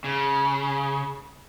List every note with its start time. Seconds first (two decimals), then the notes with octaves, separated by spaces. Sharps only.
0.04 C#3